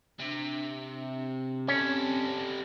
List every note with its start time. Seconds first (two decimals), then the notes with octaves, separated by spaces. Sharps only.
0.20 C3 D4
1.68 G3 C4 C#4 A4